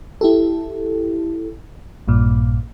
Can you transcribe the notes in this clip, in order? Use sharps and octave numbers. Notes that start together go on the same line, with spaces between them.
E4 G4 A4
A#1 G2 A#2